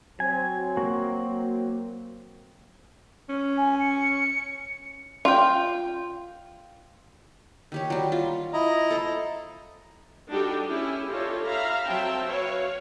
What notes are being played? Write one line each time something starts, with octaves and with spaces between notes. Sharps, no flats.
F#3 C4 G#5
A#3 F#4
C#4
G#5
C#7
F4 G5
D#3 G4 C#5
F#3 G3
F4
E4 D#5 A#5
A4 C5
G3 D4 D#4 F#4 G4 A4
C#4 E4 G4 G#4
D4 D#4 F4 G4 A4 C#5
E5 F5 A#5 B5
F#3 C4 E5 G5 A5
F#4 B4 C#5 F5